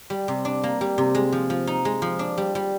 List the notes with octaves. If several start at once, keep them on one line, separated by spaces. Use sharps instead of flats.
G3
C3
D4
A#3
G3
C3
G#3
F3
F3
D#4
G#3
F3
D4
G3
G3